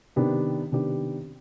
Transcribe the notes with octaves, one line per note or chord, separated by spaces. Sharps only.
C3 D#3 B3 D4 G4
C3 D#3 B3 D4 G4